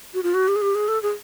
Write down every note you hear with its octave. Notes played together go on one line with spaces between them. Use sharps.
F#4
F4
F#4
G4
G#4
G4
G#4
A4
G#4